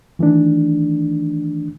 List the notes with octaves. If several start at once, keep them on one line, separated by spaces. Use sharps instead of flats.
D#3 E3 A3 D4